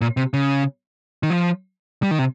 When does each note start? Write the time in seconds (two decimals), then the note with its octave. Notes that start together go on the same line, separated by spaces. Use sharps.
0.01 A#2
0.17 C3
0.34 C#3
1.23 D#3
1.30 F3
2.03 G3
2.11 D#3
2.19 C3